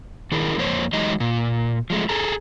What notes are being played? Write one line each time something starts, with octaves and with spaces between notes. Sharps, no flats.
D#3 E4 G#4 A#4
F2 A#3 C5 C#5
E3 F#3 G#3 D#4 G4 D#5
A#2
F3 G#3 A3
G#4 A4 A#5